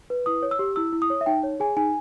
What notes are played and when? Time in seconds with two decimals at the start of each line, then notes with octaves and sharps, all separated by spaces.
0.10 B4
0.26 E4 D#6
0.42 C#5
0.51 E6
0.59 G4
0.76 E4 E6
0.93 E4
1.02 D#6
1.10 C#5
1.21 E5
1.26 D#4 G5
1.43 C#5
1.60 G#4 G#5
1.77 D#4 G#5